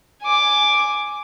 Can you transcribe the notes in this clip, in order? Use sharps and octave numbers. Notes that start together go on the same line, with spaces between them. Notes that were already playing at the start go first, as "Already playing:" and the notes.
G#5 D6